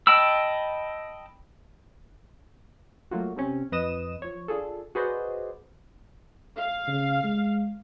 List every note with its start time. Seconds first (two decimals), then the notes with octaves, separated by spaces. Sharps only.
0.07 D#5 G5 A5 B5 E6
3.11 F#3 A3 A#3 F4 F#4
3.36 C3 C4 C#4
3.72 F2 B4 D#5 D#6 E7
4.22 F3 C#5
4.48 D4 F4 G#4 A4
4.95 F#4 G#4 B4 C5 D5 D#5
6.58 F5
6.87 C#3
7.24 G#3